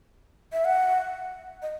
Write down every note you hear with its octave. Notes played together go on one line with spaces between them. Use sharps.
E5
F#5
D#5